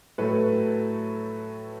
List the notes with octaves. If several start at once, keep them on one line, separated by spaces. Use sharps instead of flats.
A2 F#3 A3 A4 B4